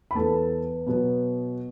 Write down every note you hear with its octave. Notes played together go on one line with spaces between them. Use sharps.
B5
E2 E3 B3 A4 A5
B2 F#3 B3